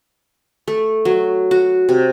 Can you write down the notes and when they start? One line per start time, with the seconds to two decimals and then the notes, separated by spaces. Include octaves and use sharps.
0.68 A3
1.05 F#3
1.51 F#4
1.89 C3